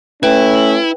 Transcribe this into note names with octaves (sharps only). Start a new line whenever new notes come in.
A3 C#4 E4 B4 G5